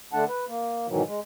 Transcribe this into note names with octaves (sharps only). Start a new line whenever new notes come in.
D3 A3 D4 F#5 A5
B4
A#3
G#2 B2 D#3 E3 F#3
G#3